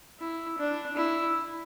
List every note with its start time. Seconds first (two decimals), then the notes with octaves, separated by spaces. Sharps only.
0.20 E4
0.58 D4
0.97 E4